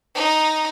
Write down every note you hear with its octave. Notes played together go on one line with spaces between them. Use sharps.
D#4